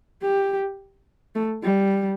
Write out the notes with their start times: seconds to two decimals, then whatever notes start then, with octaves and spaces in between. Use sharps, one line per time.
0.22 G4
1.35 A3
1.63 G3